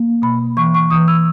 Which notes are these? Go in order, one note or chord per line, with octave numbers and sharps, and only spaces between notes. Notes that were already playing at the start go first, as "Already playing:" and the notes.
Already playing: A#3
B2 B5
E3 C#6
C#6
E3 D#6
E6